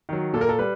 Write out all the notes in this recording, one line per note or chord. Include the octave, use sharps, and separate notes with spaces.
D#3 F#3
A#2 A4
A#4
A4
G3 B4